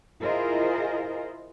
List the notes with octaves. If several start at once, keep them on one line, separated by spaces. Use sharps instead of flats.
E4 F4 G#4 A#4 C5 D#5